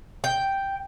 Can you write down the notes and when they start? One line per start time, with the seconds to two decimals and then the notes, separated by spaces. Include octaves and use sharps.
0.24 G5